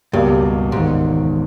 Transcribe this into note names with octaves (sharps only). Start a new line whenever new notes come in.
C#2 G2 B2 G3 A#3
E1 D#2 G#2 D#3